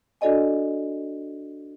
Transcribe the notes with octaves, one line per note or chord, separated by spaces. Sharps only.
D4 F#4 A4 D5 D#5 G#5